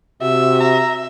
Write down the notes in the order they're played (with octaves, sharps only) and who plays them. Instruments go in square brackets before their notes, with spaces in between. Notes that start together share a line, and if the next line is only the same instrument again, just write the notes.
[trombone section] C3 [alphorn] F#4 [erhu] E5
[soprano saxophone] A#5